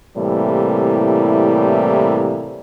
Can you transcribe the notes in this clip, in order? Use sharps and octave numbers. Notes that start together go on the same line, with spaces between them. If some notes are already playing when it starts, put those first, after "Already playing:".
A2 C3 E3 G3 A#3